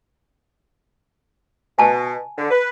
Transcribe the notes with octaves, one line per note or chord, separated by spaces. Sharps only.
B2 G#5 A5
D3
B4